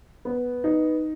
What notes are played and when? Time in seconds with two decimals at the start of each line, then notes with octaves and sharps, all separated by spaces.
0.25 B3
0.64 D#4